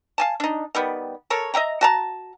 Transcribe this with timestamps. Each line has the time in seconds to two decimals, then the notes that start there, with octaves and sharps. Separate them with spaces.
0.18 F5 G#5 A5
0.40 D4 D#4
0.75 D#3 G3 B3
1.30 A4 A#4 C#5
1.54 D#5 E5 G5 A#5
1.81 F#4 A5 A#5